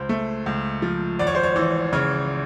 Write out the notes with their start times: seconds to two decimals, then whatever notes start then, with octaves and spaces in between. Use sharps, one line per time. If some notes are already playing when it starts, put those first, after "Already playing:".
Already playing: C#2 C5
0.09 A3
0.46 C#2
0.82 F3
1.19 G#1 D5
1.27 C#5
1.35 C5
1.43 C#5
1.56 E3
1.93 C#3 C#5